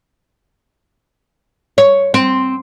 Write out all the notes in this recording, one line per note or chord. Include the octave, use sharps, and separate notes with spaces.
C#5
C4